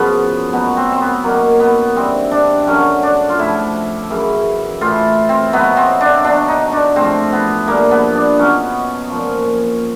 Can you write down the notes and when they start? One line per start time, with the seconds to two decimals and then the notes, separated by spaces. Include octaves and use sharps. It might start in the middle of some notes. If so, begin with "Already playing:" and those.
Already playing: F#2 C#3 F3 B3
0.53 B2 F#3 B3
0.77 C4
0.92 C4
1.01 B3
1.24 F#2 D#3 F#3 A#3
1.60 B3
1.96 G2 E3 C4
2.31 D4
2.67 F#2 D3 F#3 C#4
3.03 D4
3.29 F4
3.39 A2 F3 E4
4.10 F#2 C#3 E3
4.81 A2 E3 F4
5.29 C4
5.53 B2 F#3 B3
5.77 C4
6.01 D4
6.24 B2 F#3 D4
6.48 D#4
6.72 D4
6.96 A2 F3 C4
7.32 B3
7.67 G2 D3 F3 A#3
7.91 B3
8.16 D4
8.39 B2 F#3 C#4
9.10 A#2 F3